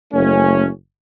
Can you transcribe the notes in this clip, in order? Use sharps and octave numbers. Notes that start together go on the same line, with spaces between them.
F#1 A3 C#4